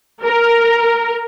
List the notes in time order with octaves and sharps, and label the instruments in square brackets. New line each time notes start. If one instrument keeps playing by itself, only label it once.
[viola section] A#4